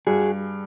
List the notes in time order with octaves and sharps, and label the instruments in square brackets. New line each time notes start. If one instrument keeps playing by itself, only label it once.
[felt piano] G2 [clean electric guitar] F#4 G#4